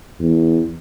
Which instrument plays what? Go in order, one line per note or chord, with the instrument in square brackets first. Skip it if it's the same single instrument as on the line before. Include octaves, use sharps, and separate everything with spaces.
[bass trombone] E2